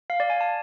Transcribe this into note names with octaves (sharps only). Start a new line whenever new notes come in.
F5
D5
G#5
A5